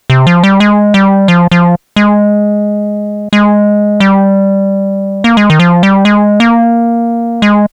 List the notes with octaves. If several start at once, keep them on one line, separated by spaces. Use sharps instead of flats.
C3
F3
G3
G#3
G3
F3
F3
G#3
G#3
G3
A#3
G#3
D#3
F3
G3
G#3
A#3
G#3